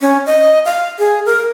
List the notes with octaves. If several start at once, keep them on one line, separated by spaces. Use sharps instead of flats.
C#4
D#5
F5
G#4
A#4